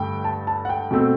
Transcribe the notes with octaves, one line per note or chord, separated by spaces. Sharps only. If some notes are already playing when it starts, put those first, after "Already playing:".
Already playing: G2 D3 A3 G5
A5
A5
F#5
G5
B2 A3 C4